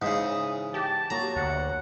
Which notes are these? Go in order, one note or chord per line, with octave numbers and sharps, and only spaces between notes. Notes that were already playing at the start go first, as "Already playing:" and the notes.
G#2 C#3 E3 D#6
G4 A5
F#3 A#3 F#4 A#5
D2 F#5